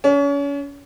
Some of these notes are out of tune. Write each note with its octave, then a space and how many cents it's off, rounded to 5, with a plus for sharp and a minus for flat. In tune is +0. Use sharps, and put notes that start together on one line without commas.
C#4 +35